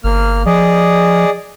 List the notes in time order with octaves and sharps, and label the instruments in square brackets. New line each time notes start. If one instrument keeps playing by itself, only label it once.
[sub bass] G1 [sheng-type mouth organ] A#3 F6
[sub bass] F3 [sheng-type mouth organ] G#4 D5 D#5